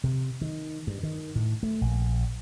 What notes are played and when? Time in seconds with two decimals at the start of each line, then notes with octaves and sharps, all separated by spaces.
0.04 C3
0.41 D#3
0.87 G2
1.03 D#3
1.36 A2
1.63 A3
1.81 A#1